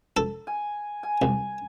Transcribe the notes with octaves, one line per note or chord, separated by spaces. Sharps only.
A4
G#5
G#5
C2